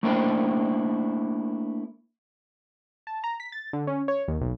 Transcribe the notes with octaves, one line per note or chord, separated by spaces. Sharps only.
A3 A#3 D4 E4 C5 G5
A5
A#5
B6
A6
D3
C#4
C#5
D#2
B1